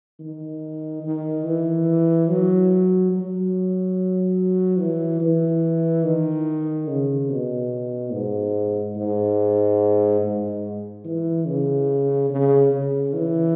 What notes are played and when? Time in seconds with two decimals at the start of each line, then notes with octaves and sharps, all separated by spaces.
0.20 D#3
1.03 D#3
1.45 E3
2.28 F#3
3.11 F#3
4.78 E3
5.20 E3
6.03 D#3
6.87 C#3
7.30 B2
8.12 G#2
8.96 G#2
10.21 G#2
11.05 E3
11.47 C#3
12.30 C#3
12.71 C#3
13.13 E3